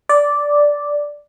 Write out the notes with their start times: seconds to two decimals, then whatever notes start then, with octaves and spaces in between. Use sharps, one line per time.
0.09 D5